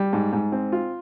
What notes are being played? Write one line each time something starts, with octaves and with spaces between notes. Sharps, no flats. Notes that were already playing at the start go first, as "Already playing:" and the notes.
Already playing: G3
G#2
G#2
C4
F4